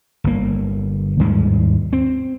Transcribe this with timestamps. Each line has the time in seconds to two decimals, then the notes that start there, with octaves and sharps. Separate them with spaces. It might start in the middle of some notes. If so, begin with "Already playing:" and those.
0.24 G1 A#3
1.20 D#2 G#2 G3 G#3
1.93 C4